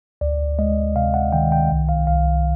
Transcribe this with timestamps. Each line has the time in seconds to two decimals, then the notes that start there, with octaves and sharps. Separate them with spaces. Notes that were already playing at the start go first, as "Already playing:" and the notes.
0.21 D2 D5
0.59 G#3 D#5
0.96 C3 F5
1.14 F#5
1.32 D#3 G5
1.52 G5
1.70 C2
1.89 F5
2.07 C2 F5